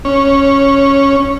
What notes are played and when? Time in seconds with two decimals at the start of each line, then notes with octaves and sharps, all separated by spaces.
0.05 C#4